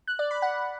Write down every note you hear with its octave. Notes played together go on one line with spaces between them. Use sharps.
F#6
D5
B5
F#5